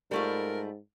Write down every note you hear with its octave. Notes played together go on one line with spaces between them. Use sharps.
G#2 G3 A3 F4 A#4